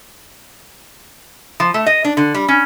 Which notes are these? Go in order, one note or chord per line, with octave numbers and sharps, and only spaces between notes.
F3
A3
D#5
D4
D3
G3
C#4